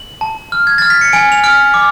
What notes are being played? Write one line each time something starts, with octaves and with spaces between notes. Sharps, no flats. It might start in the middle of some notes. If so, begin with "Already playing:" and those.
Already playing: F#7
A5
F6
G#6
F6 A6
B6
C#7
G#5 D7
F7
F6 D7
D6